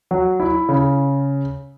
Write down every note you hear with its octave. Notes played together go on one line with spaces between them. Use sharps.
F#3
E4
C#3